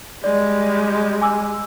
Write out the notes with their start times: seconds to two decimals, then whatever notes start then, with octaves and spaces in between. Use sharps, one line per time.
0.24 G3 G#3 D5
1.21 G#5 D6 E6